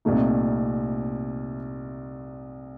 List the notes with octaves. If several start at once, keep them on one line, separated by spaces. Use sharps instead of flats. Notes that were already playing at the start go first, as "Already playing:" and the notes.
C2 A#2 A3 D#4